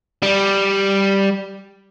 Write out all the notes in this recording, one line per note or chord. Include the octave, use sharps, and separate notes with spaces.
G3